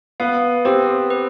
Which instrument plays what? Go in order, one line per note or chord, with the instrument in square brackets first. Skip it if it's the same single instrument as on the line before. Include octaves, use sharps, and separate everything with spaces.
[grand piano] B3 [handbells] F5
[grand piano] C4 [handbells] G4
[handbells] B4